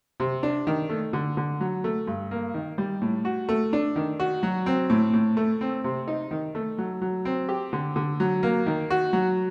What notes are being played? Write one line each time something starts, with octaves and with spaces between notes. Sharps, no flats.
C3
D4
D#3
A3
D3
D3
F#3
A3
G2
A#3
D#3
G3
A2
F#4
A3
D4
D#3
F#4
F#3
C4
A2
A2
A3
C4
C3
D#4
D#3
A3
F#3
F#3
C4
G4
D3
D3
F#3
A#3
D#3
F#4
F#3